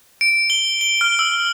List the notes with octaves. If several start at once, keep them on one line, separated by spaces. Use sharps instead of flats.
D7
G7
G7
F6
E6